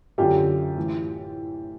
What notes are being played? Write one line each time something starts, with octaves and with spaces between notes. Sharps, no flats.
F#2 D3 F4 G4
A2 E3